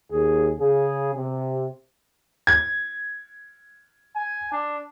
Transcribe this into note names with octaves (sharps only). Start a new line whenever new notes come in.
D#2 G#4
C#3 G#4
C3
G#6
G#5
D4